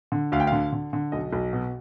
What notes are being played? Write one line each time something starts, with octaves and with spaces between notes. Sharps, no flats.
D3
D2 F5
G5
D3 F5
D3
D3
B1 D#5
B1
B2